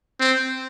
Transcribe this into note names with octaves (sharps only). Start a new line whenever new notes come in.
C4